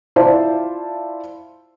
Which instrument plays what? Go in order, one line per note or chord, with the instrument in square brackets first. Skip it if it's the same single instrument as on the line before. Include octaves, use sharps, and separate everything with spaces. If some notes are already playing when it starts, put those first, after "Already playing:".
[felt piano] E4 F4 C5 D5 A5